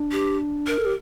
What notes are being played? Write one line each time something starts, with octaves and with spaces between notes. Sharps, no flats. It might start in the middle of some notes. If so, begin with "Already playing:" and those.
Already playing: D4
G4
A#4
A4
G4